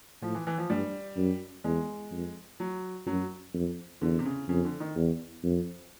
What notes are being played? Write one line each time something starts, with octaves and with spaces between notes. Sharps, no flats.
A2 F3
E3
E3
F3
G2 G3
F#2
E2 G#3
F2
F#3
F#2 F#3
F2
E2 D3
C3
C#3
F2 C#3
D3
D#3
E2
F2